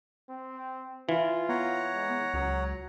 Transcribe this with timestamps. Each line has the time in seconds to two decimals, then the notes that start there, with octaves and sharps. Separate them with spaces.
0.29 C4
1.09 E3 F4
1.49 B3 C#5 F#5 A#5
1.94 G#3
2.34 C#2 F#3